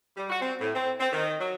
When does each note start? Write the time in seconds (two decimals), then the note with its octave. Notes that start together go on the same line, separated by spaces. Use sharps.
0.17 G3
0.30 F#4
0.41 C4
0.60 A2
0.75 C4
0.99 C4
1.12 D#3
1.40 F#3